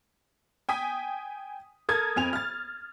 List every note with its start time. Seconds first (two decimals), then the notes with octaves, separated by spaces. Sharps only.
0.69 G5 G#5 D#6 B6
1.89 A4 A#4 D#6 F6 G#6 A6
2.16 F2 C4 G#5 F7
2.33 F6 A6